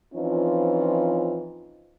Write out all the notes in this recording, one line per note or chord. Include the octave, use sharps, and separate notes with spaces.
E3 F3 C4 C#4 D#4 F4